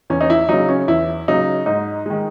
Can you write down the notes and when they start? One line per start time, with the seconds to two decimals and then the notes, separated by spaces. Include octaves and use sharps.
0.10 E2 C#4
0.21 D#4
0.30 E4
0.49 C#3 F#3 D#4
0.69 C#4
0.88 E2 E4
1.28 C#3 F#3 D#4
1.66 G#2 D#4
2.06 D#3 G#3